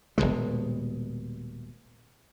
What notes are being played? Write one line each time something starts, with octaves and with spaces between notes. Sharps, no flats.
D#1 C2 B2 G#3